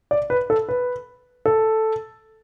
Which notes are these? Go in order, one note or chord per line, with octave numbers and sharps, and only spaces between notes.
D5
B4
A4
B4
A4